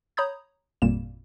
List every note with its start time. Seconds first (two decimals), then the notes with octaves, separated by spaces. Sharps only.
0.17 C#5 A#5 B5 D#6 G6 G#6
0.82 G#1 F2 A#2 G3 A#3 E7